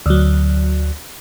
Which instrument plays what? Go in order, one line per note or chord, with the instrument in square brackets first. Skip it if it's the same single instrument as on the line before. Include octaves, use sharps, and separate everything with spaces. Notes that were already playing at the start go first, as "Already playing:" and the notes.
[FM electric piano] D2 F#3